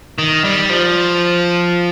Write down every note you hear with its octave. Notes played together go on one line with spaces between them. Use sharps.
D#3
G3
F3